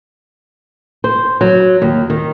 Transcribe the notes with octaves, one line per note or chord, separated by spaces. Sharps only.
C5
F#3
D#2
D#3